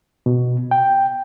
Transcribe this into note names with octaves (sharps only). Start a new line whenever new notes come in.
B2
G5